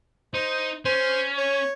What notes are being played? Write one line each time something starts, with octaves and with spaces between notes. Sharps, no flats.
D#4 C5
C#4 C5
C#5